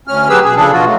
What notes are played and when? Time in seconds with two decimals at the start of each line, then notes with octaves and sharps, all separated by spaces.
0.08 D2 C#4 F6
0.29 F#3 G4 G#4 B4 E6
0.44 B2 G#4
0.56 C#3 F3 D4 G#4 A4
0.72 B2 F3 F4 F#4
0.85 F#3 A3